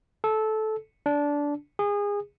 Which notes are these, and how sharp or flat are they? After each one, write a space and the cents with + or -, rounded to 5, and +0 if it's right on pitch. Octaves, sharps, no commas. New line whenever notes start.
A4 -15
D4 -15
G#4 -25